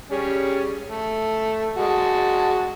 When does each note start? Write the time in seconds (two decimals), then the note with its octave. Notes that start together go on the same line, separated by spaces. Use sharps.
0.10 G3 C#4 G#4
0.86 A3
1.77 G#3 F#4 A5